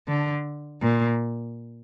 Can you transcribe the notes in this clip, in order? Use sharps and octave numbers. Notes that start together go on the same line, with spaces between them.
D3
A#2